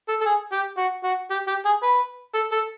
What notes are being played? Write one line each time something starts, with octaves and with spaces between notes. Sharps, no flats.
A4
A4
G#4
G4
F#4
F#4
G4
G4
G#4
B4
A4
A4